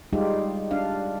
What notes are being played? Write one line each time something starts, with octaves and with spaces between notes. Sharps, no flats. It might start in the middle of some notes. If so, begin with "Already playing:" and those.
G3 G#3 D#4 F4 G4
D4 F5